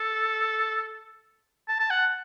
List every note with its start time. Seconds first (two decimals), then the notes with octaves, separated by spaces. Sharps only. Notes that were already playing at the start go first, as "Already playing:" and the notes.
Already playing: A4
1.68 A5
1.79 A5
1.90 F#5